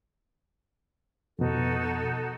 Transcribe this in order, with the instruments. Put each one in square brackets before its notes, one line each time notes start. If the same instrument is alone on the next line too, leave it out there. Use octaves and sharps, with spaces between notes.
[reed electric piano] F2 B2 [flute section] D#4 F#4 A4